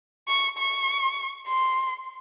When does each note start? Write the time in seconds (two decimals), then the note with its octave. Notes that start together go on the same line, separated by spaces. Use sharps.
0.28 C#6
0.58 C#6
1.48 C6